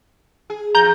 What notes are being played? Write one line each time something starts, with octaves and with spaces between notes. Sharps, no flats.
G#4
E2 A#5 G6